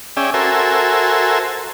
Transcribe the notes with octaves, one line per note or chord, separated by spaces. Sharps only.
C#4 G#4 D5 E5 G5
F#4 A4 A#4 C5 E5 G#5